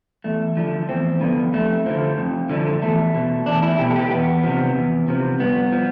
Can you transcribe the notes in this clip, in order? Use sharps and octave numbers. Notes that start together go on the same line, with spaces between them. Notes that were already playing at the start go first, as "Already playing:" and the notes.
E2 A3
D3 F3
E2 C4
D3 F3 B3
F2 A3
D3 F3
F2
D3 F3
E2 A3
B2
E2 D4
E4
B2 G4
A4
G4
E2 B3
C3 F3
E2
C3 F3
G2 B3
F3